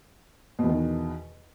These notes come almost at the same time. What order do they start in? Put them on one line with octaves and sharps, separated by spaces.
B2 E2 D#3